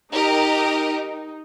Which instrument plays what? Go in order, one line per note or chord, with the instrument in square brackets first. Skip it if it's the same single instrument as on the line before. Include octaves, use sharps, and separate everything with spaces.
[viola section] D#4 [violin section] G4 A#4 D#5